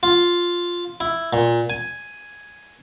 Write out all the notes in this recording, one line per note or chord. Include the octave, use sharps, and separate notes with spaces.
F4
E4
A#2
G#5